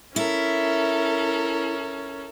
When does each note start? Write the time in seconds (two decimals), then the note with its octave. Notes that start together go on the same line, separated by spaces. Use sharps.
0.16 C#4 E4 A4 A#4